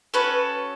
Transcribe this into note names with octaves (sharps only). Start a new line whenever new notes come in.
C#4 F#4 A4 B4